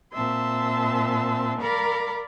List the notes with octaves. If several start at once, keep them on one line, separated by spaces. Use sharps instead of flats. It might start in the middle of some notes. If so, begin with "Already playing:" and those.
A#2 C4 E5 A5 C6
A#4 D5 F5 A#5 B5